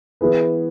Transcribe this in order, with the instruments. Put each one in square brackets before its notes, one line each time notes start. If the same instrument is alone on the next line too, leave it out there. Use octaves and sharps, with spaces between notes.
[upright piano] E3 B3 E4 G#4 B4